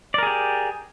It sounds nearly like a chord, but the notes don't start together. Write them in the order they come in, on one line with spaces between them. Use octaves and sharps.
D5 A#4 G#4 G4